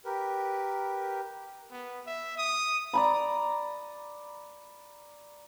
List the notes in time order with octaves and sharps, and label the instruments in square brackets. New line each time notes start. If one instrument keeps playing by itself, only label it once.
[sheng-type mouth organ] G4 A#4 B4
[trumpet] B3
E5
D#6
[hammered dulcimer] D5 A#5 B5